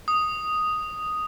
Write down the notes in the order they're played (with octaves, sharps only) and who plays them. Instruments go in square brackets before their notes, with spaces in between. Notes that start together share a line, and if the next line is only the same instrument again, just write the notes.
[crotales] D#6